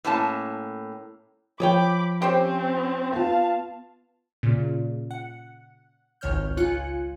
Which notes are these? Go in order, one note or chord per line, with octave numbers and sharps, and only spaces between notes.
A2 A#3 C#4 A5
F3 G#4 C#5 G5 B5 D6
C4 C#4 G4 C5 C#5
B3 F4 F5 A5
A#2 C#3
F#5
G#1 C#2 D#3 C#5 F6 G6
C#2 F4 G#5 F#6 C#7